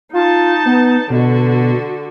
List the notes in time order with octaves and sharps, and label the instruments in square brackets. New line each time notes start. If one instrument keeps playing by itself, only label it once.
[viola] D#4 A5 [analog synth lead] F4
[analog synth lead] B3
[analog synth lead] B2 [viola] D3 F#4